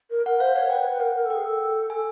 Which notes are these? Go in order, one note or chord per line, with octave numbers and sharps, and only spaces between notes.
A#4
A#4 F#5
C5 F5
C#5 F#5
B4 G5
B4
B4
A#4 F#5
A#4
A4
G#4 G5
A4
A4 G#5